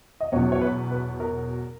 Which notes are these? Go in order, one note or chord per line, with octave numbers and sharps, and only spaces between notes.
D#5
E2 B2 F#3 C#4 C#5
C#5
B4
B4
A#4